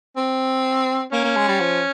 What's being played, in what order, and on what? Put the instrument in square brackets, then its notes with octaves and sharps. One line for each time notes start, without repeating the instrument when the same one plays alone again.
[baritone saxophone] C4
[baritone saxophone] A#3 [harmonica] C#4
[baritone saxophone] A#3
G#3
G3
F3